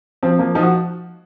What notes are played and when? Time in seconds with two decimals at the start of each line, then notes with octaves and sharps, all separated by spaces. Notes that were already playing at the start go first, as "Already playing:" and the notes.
0.23 F3 C4
0.39 F3 A#3
0.55 F3 D#4
0.63 F#4